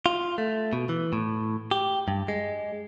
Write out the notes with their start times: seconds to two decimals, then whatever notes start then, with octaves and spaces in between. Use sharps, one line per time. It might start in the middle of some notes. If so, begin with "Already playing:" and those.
0.06 F4
0.38 A3
0.73 B2
0.89 E3
1.13 A2
1.71 G4
2.08 G2
2.28 G#3